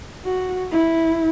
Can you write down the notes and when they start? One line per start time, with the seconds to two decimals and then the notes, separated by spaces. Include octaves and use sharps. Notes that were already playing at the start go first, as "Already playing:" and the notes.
0.25 F#4
0.71 E4